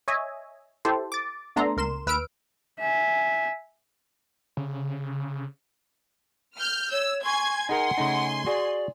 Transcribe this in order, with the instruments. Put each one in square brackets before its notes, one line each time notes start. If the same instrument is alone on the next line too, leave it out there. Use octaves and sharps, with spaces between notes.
[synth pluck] C#5 D#5 E5 G#5
E4 G4 A4 C5
D6 A6
A3 B3 D4 A4 A#5 C6
C#2 A#4 C6 E7
D#2 B4 E6 F6 D7
[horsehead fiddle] E5 G#5
[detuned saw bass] C#3
[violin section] F6 G6
[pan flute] C#5 [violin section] E6
[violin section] G#5 C6 G#6 [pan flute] C#6
[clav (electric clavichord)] D#4 G#4 A#4 [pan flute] F#5 [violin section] G#5 C6
[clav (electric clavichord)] C#3 A3 D#4
[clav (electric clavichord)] F#4 G#4 [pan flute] D5